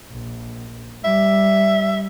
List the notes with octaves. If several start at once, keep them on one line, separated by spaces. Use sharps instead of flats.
A#1
G3 E5